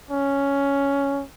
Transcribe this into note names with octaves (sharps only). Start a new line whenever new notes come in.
C#4